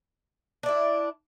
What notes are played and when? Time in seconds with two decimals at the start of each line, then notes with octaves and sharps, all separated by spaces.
0.63 D4
0.66 D5
0.69 E4